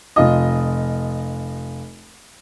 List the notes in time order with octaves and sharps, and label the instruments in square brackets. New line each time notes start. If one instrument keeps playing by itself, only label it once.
[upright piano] F1 F4 D#5